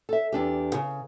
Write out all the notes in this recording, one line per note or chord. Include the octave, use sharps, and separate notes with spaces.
A4 E5
E2 D4 G4
C#3